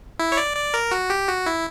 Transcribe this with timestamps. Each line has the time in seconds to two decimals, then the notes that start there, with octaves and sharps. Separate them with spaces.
0.20 E4
0.32 C#5
0.37 D5
0.57 D5
0.74 A#4
0.91 F#4
1.10 G4
1.29 F#4
1.46 E4